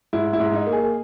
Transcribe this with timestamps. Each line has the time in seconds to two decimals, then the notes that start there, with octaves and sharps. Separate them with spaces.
0.13 G#2 E4
0.33 E4
0.40 G#2
0.53 D#4
0.67 A#3
0.72 G#4